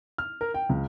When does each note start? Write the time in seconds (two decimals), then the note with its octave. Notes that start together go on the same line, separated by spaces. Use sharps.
0.18 F6
0.41 A#4
0.54 G5
0.69 C#2